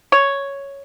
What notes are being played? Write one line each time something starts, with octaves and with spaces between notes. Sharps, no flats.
C#5